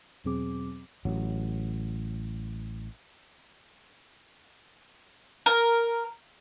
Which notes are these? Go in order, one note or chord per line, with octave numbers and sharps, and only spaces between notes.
E2 B2 F#3 C4 G#4 D6
A1 F#3
A#4